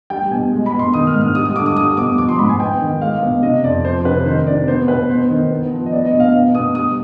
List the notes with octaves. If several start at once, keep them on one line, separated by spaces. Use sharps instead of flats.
G3 G5
B2 G#5
G#3
B5
B2
C6
D#3 D#6
F6
G#2
F6
G3 D#6
D#6
D3 D6
D#6
G3 D#6
B2 D6
F3 D6
C6
G#2 B5
G#5
B3 G5
D#3
G#3 F5
B2
C3 D#5
F2 D5
F3 C5
C3 B4
D#3 C5
C3 D5
B3 C5
B2 B4
B3 C5
D#3
B3
F3
D#5
B3 D5
D#5
B2
F5
B3
B2 D#6
G3 D#6